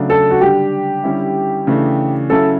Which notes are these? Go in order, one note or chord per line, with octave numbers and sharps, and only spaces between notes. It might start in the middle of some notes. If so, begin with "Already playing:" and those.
Already playing: C#3 F#3 A3 D4
A4
F#4
D3 G3 D4 G4
D3 G3 C#4 E4
C#3 E3 A3 D4
C#3 F#3 C#4 E4 A4